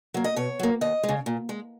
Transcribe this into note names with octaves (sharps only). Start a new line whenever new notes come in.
F#3 A#3
D#5
B2 C#5
F#3 A#3
D#2 D#5
G#3
C#3
A#2
G#3